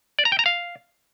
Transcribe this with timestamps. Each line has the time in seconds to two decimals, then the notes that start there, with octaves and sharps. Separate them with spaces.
0.19 D5
0.25 A#5
0.32 G5
0.39 A#5
0.46 F5